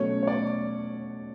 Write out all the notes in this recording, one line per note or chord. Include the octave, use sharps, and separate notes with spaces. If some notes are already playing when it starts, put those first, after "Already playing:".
Already playing: B2 F#3 A3 C#4 C#5
C#5
D5